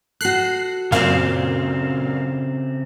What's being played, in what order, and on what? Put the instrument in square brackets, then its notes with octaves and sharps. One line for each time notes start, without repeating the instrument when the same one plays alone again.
[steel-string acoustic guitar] F#4 A4 [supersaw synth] F#6 C7
[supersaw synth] F#2 A#2 F5 [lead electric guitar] C#3 C4